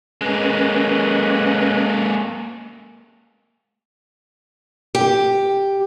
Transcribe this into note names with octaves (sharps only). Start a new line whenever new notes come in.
G#3 A#3 C#4 B4 D#5
G4